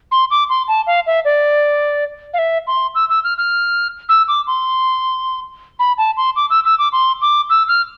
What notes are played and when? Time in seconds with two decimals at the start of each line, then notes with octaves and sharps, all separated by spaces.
0.12 C6
0.31 D6
0.49 C6
0.68 A5
0.87 F5
1.07 E5
1.25 D5
2.34 F5
2.38 E5
2.67 C6
2.95 E6
3.10 E6
3.24 F6
3.38 F6
4.09 E6
4.28 D6
4.47 C6
5.79 B5
5.98 A5
6.17 C6
6.36 D6
6.50 E6
6.65 E6
6.79 D6
6.93 C6
7.22 D6
7.50 E6
7.68 F6